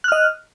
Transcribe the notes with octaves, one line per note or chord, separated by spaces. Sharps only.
D#5 F6 F#6